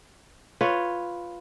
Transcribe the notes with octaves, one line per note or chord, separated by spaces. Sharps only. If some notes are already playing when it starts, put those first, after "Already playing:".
F4 B4 C#5